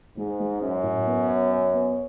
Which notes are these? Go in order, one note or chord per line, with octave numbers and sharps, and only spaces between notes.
G#2 G#3
G#3
F#2 C#4
A2
B3
C#5
C#5
B3